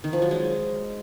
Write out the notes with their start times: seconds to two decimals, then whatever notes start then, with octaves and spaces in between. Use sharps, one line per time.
0.04 D#3
0.13 F3
0.22 F#3
0.31 G#3